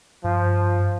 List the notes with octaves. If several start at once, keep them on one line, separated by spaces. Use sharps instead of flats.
G2 F3